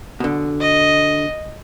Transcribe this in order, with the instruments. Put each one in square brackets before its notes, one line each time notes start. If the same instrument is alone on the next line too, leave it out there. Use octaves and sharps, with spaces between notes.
[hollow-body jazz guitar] B2 D3
[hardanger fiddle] D#5